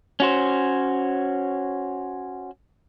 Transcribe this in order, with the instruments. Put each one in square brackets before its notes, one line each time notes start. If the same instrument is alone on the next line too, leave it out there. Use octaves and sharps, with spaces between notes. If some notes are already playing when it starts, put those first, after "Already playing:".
[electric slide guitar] C#4 F#4 C5